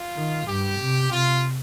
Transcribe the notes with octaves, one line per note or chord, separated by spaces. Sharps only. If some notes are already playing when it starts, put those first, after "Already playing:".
Already playing: F4
D#3
G2 G4
C3
C3 F4